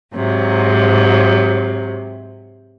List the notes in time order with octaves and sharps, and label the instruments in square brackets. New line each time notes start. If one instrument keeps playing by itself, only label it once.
[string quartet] G#2 C3 F#3